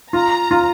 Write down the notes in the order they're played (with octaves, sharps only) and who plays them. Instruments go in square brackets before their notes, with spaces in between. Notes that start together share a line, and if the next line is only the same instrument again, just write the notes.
[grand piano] F4 [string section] A#5
[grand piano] F4